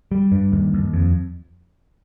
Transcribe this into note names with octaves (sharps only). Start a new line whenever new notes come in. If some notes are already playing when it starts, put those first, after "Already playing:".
G3
G2
D#2
D#2
F2